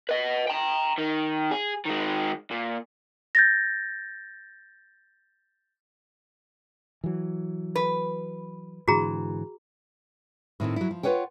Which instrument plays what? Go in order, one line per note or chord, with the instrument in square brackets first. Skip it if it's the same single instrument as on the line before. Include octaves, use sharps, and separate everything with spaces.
[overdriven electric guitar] B4 D#5
G5 A#5
D#3
G#4
D#3 G#3
A#2
[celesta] G6 A6 A#6
[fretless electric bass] E3 F#3
[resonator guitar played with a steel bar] B4
[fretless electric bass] G#2 D3 E3 [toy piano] F#4 G#4 A#5
[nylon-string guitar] A2 D#3 C4 E4
F#3 E4
F3
F4 F#4 B4 C#5 F#5 G5